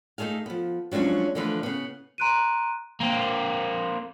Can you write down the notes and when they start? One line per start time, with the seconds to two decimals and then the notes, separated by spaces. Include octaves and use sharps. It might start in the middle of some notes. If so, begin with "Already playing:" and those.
0.18 A3 D#4 G#4 A4 F5
0.46 F3 B3
0.91 F3 F#3 G#3 C#4 D4
1.35 D3 E3 F3 A3 B4
1.63 C#3 B3
2.18 A#5 C6 F#6 D7 D#7
3.00 A#3 C4